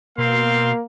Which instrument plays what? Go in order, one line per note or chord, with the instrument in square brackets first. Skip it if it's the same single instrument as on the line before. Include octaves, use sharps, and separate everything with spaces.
[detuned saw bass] B2 [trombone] A#3 [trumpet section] C4 F5 C6